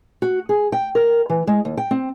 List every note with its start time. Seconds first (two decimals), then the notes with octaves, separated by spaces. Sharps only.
0.22 F#4
0.49 G#4
0.72 G5
0.95 A#4
1.30 E3
1.47 G#3
1.65 D#2
1.77 G5
1.91 C4